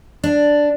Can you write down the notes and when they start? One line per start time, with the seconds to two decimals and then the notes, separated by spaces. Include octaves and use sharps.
0.24 D4